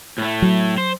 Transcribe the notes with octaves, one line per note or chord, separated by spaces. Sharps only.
A2 A3
F#3
C5